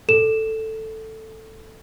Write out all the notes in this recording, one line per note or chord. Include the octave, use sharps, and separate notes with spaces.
A4 E7